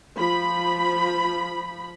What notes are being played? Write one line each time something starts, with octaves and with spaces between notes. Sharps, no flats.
F3 B5